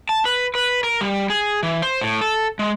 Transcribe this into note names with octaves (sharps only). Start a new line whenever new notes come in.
A5
B4
B4
A#4
G3
G#4
E3
C5
A2
A4
G#3